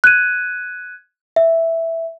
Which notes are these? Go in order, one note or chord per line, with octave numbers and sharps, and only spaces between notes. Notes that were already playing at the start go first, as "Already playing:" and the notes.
F#6 G#6 D#7
E5